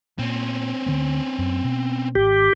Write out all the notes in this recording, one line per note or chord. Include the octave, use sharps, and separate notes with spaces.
A#2 C4 C#4
D2 D3 B3
F#2
B2
G#1 G4